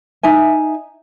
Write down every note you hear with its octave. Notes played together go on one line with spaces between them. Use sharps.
D#4 E5 G#5